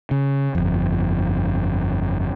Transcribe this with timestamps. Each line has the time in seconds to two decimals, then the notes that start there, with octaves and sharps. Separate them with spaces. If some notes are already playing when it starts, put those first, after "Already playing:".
0.11 C#3
0.55 G1 F2